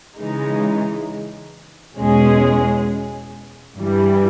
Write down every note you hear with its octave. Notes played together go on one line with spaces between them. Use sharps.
C#3 E3 G#3 D#4
E2 B2 G#3 C#4 G#4
G2 E3 G3